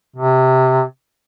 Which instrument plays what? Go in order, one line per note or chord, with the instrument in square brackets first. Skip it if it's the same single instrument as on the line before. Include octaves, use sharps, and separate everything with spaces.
[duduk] C3